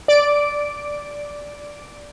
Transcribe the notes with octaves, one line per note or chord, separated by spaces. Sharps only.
D5 D7